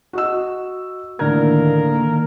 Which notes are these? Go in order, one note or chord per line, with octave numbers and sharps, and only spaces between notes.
F#4 D#5 E6
A2 D3 D#3 A#3 A#4 G#6